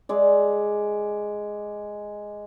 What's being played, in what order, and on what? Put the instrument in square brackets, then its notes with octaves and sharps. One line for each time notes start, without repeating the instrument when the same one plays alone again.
[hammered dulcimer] G#3 D5